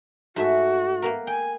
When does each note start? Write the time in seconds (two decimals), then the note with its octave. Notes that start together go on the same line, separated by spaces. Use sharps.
0.36 G#2 A3 F#4 E5
1.02 A#3 B3 A#4
1.27 G5 G#5